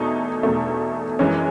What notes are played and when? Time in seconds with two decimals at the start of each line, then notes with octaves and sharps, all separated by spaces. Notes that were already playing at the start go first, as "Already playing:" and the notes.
Already playing: E2 B2 A3 D#4
0.43 E2 B2 A3
1.19 F#2 E3 G#3 C#4